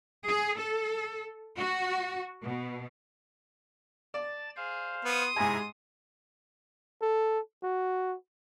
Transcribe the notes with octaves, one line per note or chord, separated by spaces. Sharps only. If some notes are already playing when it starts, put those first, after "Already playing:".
G#4
A4
F#4
B2
D5 A5 A6
G#4 C5 F5
B3 C6 D#6
G#2 C3 E4 G#4 G#5 A#5
A4
F#4